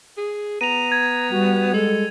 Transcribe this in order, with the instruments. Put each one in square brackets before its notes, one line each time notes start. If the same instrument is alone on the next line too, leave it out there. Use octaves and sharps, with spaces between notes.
[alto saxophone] G#4
[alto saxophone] B3 [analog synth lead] A#5 [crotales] D#7 F7
[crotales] G#6
[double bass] G3 [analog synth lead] F#4
[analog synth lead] G#3 [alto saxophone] A4